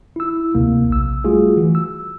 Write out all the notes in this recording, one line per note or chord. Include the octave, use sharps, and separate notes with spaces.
E4 E6
D2 C3 A#3
A#1 E6
G3 A3 F4 F#4 G#4
E3
E6